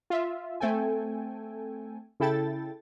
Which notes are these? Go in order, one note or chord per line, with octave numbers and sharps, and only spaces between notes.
F4 E5
A3 C4 A4 G5 G#5
C#3 E4 A4 G5 A6